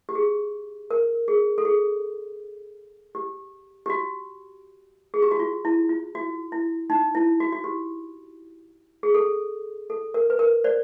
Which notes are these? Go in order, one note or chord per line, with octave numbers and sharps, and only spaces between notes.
G4
G#4
A#4
G#4
A4
G#4
G4
G4
F#4
G#4
G4
F#4
F4
E4
F4
F#4
E4
D#4
E4
F#4
F#4
G4
G#4
A4
A4
A#4
B4
A#4
C5 D5